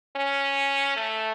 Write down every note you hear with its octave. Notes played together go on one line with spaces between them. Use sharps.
C#4
A3